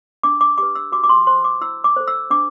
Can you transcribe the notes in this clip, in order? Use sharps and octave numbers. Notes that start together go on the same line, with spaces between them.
D4 D6
D6
G4 B4 D6
E6
F#4 D6
D6
C6
C5 C6
D6
E4 E6
D6
A4 C5
E6
D4 D6